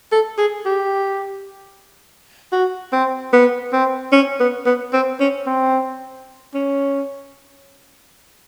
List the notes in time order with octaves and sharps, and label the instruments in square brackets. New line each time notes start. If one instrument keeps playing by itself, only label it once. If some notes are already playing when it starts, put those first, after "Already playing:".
[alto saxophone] A4
G#4
G4
F#4
C4
B3
C4
C#4
B3
B3
C4
C#4
C4
C#4